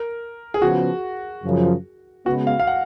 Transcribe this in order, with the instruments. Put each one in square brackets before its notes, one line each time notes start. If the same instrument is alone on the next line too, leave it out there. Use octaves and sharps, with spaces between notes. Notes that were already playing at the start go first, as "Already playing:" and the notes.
Already playing: [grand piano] A#4
G#4
[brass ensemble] C#3 F3 B3 [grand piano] F#4
[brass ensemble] F#2 C#3 F3
[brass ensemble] C#3 G#3 B3 [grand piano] F#4
[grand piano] F5
F5
F#5